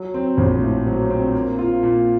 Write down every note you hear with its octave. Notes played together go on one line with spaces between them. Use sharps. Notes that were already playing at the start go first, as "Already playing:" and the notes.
Already playing: F#3
C4
A#1
A2
F#3
C4
A#3
F4
A#2